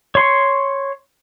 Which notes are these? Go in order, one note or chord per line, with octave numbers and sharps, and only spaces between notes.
C#5 C6 C#6